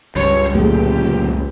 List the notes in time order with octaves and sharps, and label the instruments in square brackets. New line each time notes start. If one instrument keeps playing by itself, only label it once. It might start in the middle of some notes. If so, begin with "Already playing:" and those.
[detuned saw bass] C#2 [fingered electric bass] G2 [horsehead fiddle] C#5
[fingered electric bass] F#2 A#2 D3 [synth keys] A3 G#4 [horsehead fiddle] G4